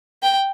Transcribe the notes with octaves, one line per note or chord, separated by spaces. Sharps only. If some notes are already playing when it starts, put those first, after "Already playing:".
G5